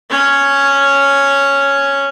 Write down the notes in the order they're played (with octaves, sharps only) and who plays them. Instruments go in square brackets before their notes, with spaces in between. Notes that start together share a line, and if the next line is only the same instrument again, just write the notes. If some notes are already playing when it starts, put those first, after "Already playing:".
[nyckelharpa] C#4 C#5